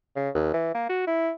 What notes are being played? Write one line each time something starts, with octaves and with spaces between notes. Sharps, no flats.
C#3
D#2
E3
A#3
F#4
E4